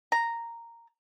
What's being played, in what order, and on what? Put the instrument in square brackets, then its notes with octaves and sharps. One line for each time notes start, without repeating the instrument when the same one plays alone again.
[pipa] A#5